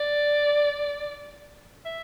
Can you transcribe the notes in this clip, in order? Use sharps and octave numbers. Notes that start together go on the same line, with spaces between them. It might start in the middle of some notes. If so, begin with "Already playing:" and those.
Already playing: D5
E5